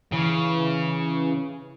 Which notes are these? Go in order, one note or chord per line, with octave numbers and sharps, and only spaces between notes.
C#3 E3